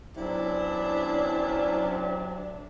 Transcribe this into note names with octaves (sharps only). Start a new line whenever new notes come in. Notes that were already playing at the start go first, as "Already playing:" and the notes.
D2 C3 F#3 B3 C#4 D4 E4 F4